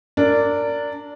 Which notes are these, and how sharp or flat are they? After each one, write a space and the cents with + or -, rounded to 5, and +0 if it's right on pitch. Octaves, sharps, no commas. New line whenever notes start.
D4 -10 A#4 -25